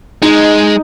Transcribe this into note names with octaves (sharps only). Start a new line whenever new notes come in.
G#3 D#4